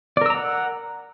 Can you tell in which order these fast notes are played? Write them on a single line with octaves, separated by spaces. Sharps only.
D5 A#4 E6 A#5 F#5